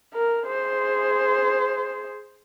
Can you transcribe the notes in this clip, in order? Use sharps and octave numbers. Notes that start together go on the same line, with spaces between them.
A#4
G#4 C5